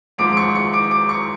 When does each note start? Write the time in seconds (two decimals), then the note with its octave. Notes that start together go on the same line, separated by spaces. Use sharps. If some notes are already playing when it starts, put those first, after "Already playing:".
0.18 G#1 G#2 F3 D6 D7
0.32 D7
0.37 C#6 C#7
0.55 C#6 C#7
0.73 D6 D7
0.91 D6 D7
1.09 C#6 C#7